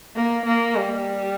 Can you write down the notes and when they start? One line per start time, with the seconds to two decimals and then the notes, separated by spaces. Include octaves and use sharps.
0.16 A#3
0.45 A#3
0.75 G3